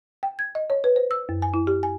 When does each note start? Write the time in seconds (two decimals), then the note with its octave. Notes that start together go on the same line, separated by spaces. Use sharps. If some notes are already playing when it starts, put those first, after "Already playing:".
0.23 G5
0.39 G#6
0.55 D#5
0.70 C#5
0.84 B4
0.96 C5
1.11 E6
1.29 F#2
1.42 G#5
1.54 E4
1.67 G4
1.83 G#5